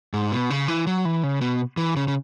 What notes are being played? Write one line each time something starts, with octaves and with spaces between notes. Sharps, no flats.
G#2
B2
C#3
E3
F#3
E3
C#3
B2
E3
C#3
C#3